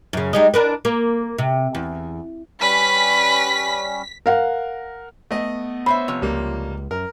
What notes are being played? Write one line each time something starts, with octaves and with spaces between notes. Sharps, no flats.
F#2 C#3
G3 G#3 D#4
D4 A#4 B4
A#3
C3
E2
G3 C#4 B4 B6
A#4 F5 F#5
A3 B3 D#5
C5 C#5 E5 B5
C3 F3 C#5
C#2 G3 A#3
F#2 A#4